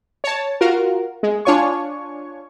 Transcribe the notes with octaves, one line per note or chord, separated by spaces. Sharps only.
C#5 A5
F4 F#4 A#4
G#3
D4 F4 C#5 G#5 C#6